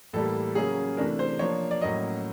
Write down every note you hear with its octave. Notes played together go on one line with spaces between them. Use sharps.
A2 E3 G3 A#3 A4
C#3 F#3 A#3 C#4 G#4
C3 E3 A3 D4 A#4
C5
F3 A#3 D4 C#5
D5
A2 F#3 A#3 C#4 D#5